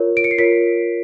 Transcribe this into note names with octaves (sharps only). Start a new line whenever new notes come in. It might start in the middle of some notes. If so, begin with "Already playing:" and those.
Already playing: F4 A#4 C#5
D7
C#7
C7
F4 A#4 C#5 B6